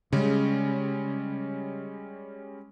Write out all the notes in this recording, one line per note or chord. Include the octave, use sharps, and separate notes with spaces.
C#3 G3 G#3 C#4